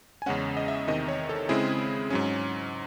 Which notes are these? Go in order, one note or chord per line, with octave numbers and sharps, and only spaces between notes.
G#5
E2 C#3 G#3 C#4 F#5
D#5
E5
E2 C3 D#3 D#5
C#5
A4
C#3 G#3 C4 E4 G#4
G#2 F#3 C#4